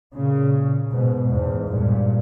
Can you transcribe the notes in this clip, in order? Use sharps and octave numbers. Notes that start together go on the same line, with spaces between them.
A#2 C#3
G#2 B2
E2 G#2
G2 A#2